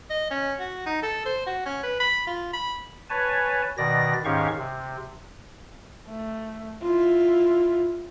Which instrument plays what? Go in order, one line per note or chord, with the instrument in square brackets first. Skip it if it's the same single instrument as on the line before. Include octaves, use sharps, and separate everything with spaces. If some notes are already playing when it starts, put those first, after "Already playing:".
[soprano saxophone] D#5
C#4
F#4
D#4
A4
C5
F#4
C#4
B4
B5
F4
B5
[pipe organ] B4 C#5 G#5 A5
B2 D#3 D5 A#6
G#2 D#3 C#4 G4 F5 C#6
C3
[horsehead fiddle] A3
E4 F4